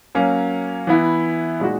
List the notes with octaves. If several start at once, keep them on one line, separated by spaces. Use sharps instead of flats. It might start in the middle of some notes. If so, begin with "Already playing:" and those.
F#3 A#3 C#4
E3 B3 E4
A#2 G#3 D#4 F#4